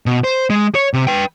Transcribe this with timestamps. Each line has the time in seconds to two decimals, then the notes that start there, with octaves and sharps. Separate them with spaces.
0.06 B2
0.24 C5
0.50 G#3
0.75 C#5
0.94 C3
1.07 B4 G5